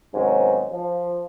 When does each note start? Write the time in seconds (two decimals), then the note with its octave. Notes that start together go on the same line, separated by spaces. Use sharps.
0.14 G#2 C3 D#3 F#3 B3 C#4
0.71 F3